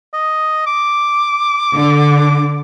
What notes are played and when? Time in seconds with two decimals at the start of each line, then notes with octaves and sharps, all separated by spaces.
0.13 D#5
0.66 D6
1.76 D3